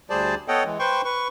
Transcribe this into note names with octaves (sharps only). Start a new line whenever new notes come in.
D2 G3 G#4 C5 D5 A5
B3 A4 C#5 D#5 F#5 G5
E3 G#3
B4 C5 G5 C6 C#6
B4 C#6